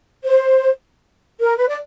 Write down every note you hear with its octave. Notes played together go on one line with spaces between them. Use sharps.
C5
A#4
B4
D5